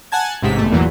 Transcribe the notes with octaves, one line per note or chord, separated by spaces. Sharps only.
F#5 G#5 A5 G#6
A1 G#2 C3 B6
G1 A3
E2 A#2 E3 F#3